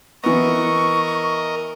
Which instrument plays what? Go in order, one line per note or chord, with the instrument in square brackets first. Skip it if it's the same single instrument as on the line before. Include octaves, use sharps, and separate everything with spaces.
[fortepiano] E3 B3 [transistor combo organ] A#4 D#5 [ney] C#6